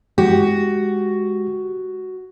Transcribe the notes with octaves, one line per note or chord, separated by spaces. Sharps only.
G#3 F#4 G4